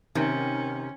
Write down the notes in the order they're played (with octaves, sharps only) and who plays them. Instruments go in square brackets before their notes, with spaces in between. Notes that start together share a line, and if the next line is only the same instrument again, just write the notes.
[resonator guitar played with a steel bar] C3 [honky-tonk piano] D#3 [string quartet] C#4